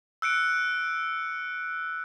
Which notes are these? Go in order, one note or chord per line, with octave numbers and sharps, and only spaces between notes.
E6 F#6 C#7 D7